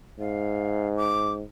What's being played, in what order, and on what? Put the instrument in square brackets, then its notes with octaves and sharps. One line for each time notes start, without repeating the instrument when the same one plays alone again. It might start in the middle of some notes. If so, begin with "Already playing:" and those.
[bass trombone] G#2 [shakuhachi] F5
[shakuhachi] D6